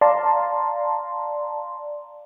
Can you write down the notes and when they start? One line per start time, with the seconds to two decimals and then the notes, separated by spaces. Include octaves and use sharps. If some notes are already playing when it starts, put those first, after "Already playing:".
0.01 D5 F5 A5 A#5 C6